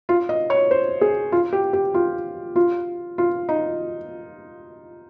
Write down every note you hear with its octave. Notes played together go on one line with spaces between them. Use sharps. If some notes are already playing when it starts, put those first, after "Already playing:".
F4
D#5
C#5
C5
G#4
F4
G4
G4
F4
F4
F4
D#4